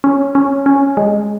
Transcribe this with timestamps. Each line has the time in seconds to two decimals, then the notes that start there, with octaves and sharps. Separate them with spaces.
0.04 C#4
0.35 C#4
0.66 C#4
0.97 G#3